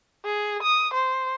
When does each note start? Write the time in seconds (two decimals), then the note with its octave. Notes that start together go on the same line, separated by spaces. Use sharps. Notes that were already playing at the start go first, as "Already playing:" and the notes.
0.25 G#4
0.63 D#6
0.94 C5